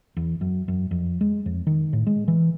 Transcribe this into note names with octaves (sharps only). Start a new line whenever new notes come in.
E2
F#2
F#2
F2
G#3
F2
D#3
A2
G#3
E3